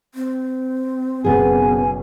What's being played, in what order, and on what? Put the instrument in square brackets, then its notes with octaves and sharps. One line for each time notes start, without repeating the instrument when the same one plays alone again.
[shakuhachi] C4
[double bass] F#1 B2 [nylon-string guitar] B3 G#4 [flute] G#5